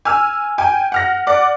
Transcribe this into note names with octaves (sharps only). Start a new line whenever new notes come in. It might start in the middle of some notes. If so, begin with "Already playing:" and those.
G#5 E6 F6
G5 G#5
F#5 F6 A#6
D5 F#5 D6